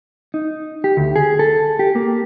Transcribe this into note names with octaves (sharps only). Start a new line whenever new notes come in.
D#4
G4
D2
G#4
A4
G4
A#3